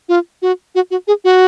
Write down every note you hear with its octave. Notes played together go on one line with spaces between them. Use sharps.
F4
F#4
F#4
F#4
G#4
F#4